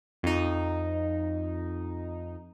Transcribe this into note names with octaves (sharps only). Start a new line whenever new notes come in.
F2 D#4